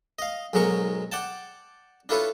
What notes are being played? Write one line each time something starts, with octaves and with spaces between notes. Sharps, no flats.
D#5 F5
B1 G#2 F#3 G#3 A#4 C#6
D5 F#5 G5 A5
D4 E4 F4 A4 B4 C#5